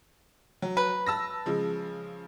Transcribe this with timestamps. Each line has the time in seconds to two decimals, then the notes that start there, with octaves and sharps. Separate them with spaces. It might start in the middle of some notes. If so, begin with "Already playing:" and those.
0.62 F#3
0.77 B4
1.07 A5 E6 A#6
1.46 C#3 F3 G#3